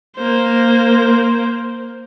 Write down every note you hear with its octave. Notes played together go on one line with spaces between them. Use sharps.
A#3 C5